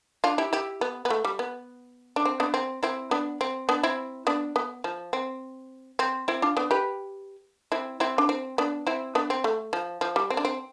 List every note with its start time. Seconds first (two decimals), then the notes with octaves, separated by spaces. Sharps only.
0.24 D4 F4
0.38 E4 G4
0.53 E4 G4
0.81 B3
1.05 B3
1.10 A3
1.25 G3
1.39 B3
2.16 D4
2.25 C4
2.40 B3 D4
2.54 C4
2.83 C4 E4
3.11 B3 D4
3.41 C4
3.69 B3 D4
3.83 C4 E4
4.27 B3 D4
4.56 B3
4.84 F3
5.13 C4
5.99 C4
6.28 C4 E4
6.42 D4 F4
6.57 B3 D4
6.71 G4 B4
7.72 C4 E4
8.00 C4 E4
8.18 D4
8.29 C4
8.58 B3 D4
8.87 C4 E4
9.15 B3 D4
9.30 C4
9.44 A3
9.73 F3
10.01 F3
10.16 G3
10.30 C4
10.37 D4
10.45 C4